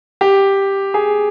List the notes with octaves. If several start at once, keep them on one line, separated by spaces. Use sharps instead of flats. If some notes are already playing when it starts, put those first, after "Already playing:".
G4
G#4